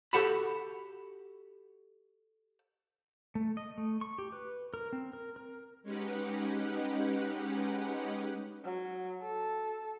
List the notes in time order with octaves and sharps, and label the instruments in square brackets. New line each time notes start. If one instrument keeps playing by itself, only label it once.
[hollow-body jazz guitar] F#4 G4 A4 F#5 A5 B5
[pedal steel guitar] A3
D#5
A3
C#6
G4
B4
A#4
C4
A#4
A#4
[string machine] G#3 C#4 D#4 G4 B4 F#5
[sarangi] F#3
A4